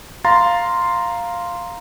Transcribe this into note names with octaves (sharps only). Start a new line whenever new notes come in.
F5 A#5 C6 A6